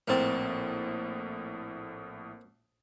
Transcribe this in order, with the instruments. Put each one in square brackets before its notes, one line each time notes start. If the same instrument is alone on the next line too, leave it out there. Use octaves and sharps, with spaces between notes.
[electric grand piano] A#1 A2 A6 [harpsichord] A#3 C4